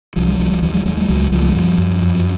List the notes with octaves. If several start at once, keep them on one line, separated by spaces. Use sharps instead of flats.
C2 F3 G3
F#3 G#3
C2 F3 G3
F3 G3
D#2 E3 F#3
F#3 G#3
D#2 F#3 G#3
G3 A3
C#2 F#3 G#3
C#2 F3 G3
A3
G#3
F#2 F3 G3
F#2
F2